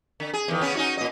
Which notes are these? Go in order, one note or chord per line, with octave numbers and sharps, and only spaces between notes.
D3
G#4
E2 D#3
C#3 B3 C#4
C#4 D#4 F#4
A#2 D#5